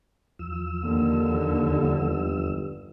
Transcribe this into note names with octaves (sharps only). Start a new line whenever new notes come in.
E2 F3 E6
D#2 D3 A#3
G1